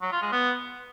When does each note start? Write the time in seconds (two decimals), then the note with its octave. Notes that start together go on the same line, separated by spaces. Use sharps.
0.02 F#3
0.12 F4
0.22 G#3
0.32 B3